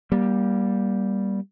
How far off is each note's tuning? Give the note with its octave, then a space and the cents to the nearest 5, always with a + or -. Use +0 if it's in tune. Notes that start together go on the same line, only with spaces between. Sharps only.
G3 +0 A#3 +30